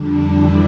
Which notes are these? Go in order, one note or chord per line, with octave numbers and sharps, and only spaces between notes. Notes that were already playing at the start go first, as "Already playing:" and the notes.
Already playing: F2 D3 G3 D4
E3 E4